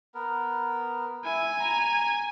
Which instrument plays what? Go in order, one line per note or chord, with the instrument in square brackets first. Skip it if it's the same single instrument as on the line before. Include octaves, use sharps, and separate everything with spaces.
[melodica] B3 A#4
[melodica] E4 [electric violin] G#5
[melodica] A#5